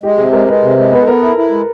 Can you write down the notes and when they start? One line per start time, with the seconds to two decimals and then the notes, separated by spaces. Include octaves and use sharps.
0.03 G#3 G4
0.18 C3 G#4
0.33 G#3 A#4
0.48 G#3 B4
0.63 C3
0.78 G#3
0.92 B3 B4
1.02 A4
1.07 B3 A#4
1.22 E4 A4
1.37 E4
1.51 G#3